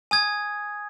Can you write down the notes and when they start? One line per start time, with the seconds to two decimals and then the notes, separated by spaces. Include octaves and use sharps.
0.11 G#5 D#6 G#6